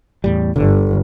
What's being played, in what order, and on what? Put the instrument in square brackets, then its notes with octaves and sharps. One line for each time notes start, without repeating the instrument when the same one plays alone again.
[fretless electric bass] E2 A2 G3
[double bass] G1 [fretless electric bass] D3